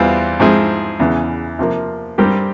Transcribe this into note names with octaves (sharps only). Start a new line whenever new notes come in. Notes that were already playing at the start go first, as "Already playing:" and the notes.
Already playing: E2 E3 G3 C4 F4
G#2 F3 C4 E4 G#4
E2 C#3 E3
C3 F3 A#3
G2 G3 C4 G4 A#4